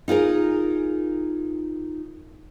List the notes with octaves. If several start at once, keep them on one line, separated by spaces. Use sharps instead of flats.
D#4 F4 G#4 A#4